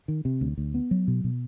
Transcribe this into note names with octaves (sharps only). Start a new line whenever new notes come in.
D#3
C3
D2
D2
B3
F#3
B2
B2